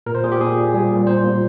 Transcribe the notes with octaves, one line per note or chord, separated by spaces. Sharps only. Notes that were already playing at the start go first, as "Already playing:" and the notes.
A#2 A#4
C5
A#2 G#4
G4
A#2 G#4
A#2
G3
A#2
A#2 C5
A#2